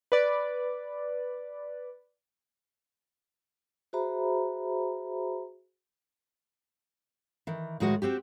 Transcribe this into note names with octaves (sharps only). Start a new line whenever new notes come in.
B4 D5
F#4 G#4 C5 E5 A#5 B5
D#3 E3
A2 D#3 G#3 F#4 F#5
C4 F#4 G4